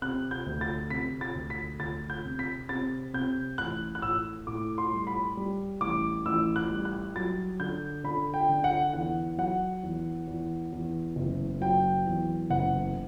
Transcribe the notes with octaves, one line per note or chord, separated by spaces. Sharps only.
C3 F#6
G6
D2
A6
C3 B6
A6
D2
B6
D2 A6
G6
C3
B6
C3 A6
C3 G6
A1 F#6
F#6
A2 E6
A2 D6
C6
G3
B5
G3
A1 D6
A1 E6
F#6
G3
F#6
F#3 A6
D3 G6
D3 B5
G5
D3
F#5
E2 F#5
F#3 F#5
E2
E2
E2
F#1
F#3 G5
E2
F#1 F#5